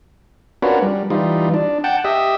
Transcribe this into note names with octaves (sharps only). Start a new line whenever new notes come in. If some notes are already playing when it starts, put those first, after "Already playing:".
C#4 D4 F4 F#4 A#4 B4
G3
E3 G3 D#4 F4
D4
F#5 G5 A5
G4 D#5 E5